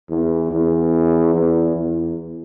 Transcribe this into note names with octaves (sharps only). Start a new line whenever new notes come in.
E2
E2
E2
E2